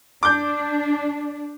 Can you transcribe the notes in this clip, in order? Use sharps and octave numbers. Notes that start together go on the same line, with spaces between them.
D4 D6 G6